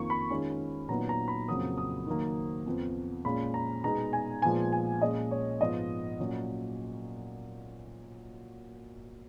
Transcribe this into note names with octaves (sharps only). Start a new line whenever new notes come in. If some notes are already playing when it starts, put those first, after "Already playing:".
Already playing: F2 D#3 A#3 F4 C#6
B5
D#3 G#3 C#4 F4
A#2 F#3 B3 D#4 A#5
A#5
B5
F2 C#3 F#3 A#3 D#6
D#6
D#3 F#3 A#3
F2 F3 B3
A#2 G#3 C#4 F4 B5
A#5
B2 G#3 B3 D#4 A#5
G#5
A#2 F3 G#3 B3 F4 G#5
G#5
A#2 G#3 C#4 F4 D#5
C#5
G#2 F3 B3 F4 D#5
A#2 F#3 C#4